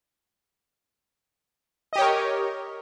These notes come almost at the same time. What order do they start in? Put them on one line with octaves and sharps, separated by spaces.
D#5 G4 C#5 A#4